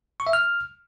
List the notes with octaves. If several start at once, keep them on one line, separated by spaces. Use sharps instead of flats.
C#6
E5
F6